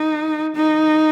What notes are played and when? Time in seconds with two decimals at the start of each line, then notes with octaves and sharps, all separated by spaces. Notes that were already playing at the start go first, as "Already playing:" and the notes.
Already playing: D#4
0.56 D#4